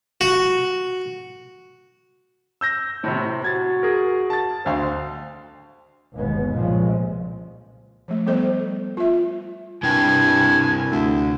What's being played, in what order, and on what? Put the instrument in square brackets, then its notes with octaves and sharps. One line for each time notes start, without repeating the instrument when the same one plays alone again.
[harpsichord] F#4
[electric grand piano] E6 G6 A#6
[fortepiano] A2 C3 [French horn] C5
[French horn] F#4 [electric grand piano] G#6 A6
[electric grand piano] G#4 A#4
A5 A6
[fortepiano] D2 F5 [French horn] C5
[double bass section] G1 D#2 B2 G#3 B3
C2 A#2 C#3 F3 G3 G#3
[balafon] F3 A3
G3 B3 A4 C5 D#5
F4 E5
[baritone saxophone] G2 [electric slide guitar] C3 E4 G5 [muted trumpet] G#5
[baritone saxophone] D2